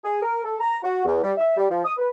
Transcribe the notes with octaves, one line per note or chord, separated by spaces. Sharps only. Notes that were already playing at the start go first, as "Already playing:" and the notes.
G#4
A#4
A4
A#5
F#4
E2
G3
E5
G3
F3
D#6
B4